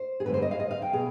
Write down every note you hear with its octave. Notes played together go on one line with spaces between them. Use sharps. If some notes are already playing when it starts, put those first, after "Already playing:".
Already playing: C5
G#4
G2 D3 G#3 B3 B4
C5
D#5
F5
D#5
F5
G5
B2 G#4